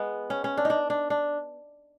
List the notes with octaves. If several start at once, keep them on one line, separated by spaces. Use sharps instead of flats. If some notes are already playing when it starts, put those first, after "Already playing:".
Already playing: G#3 B3
C#4
C#4
D4
D#4
D4
D4
D4